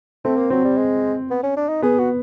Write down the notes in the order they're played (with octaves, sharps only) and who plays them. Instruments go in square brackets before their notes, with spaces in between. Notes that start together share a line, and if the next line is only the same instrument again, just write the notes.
[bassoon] A3 [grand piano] C4
[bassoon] A#3
[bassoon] F#3 [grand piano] C4
[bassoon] G3
G#3
B3
C#4
D4
D#4
[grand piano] B3 [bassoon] G#4
[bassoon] F#4